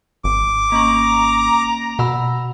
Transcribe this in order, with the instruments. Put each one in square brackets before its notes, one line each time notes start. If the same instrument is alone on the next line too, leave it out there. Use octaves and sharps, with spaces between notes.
[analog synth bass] G#1 [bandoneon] D6
[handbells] A#3 C#4 C#6 [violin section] A#5
[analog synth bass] B2 [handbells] F#5 B5 E6